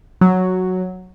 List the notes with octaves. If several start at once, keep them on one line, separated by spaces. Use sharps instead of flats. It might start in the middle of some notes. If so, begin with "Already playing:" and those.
F#3